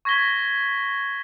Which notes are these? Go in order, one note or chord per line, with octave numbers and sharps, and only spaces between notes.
C#6 G#6 A#6 B6 G7